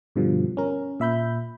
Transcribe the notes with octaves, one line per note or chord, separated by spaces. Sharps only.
G2 B2 D3 F3 G3
C#4 A#4
A#2 E5 B5 G6